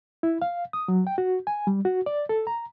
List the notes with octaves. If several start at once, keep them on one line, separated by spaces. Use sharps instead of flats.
E4
F5
D#6
F#3
G5
F#4
G#5
G3
F#4
D5
A4
A#5